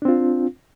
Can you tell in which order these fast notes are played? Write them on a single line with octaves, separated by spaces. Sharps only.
D4 C4 F4